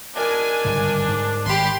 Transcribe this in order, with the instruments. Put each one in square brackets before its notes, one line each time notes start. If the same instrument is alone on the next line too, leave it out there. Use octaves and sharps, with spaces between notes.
[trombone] D4 [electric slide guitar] A#4 C5 D#5 [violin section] G#5
[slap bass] G1 G#2 C#3
G#2
[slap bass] G#1 [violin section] G4 B5 C6